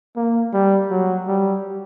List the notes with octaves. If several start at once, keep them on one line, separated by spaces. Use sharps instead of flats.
A#3
G3
F#3
G3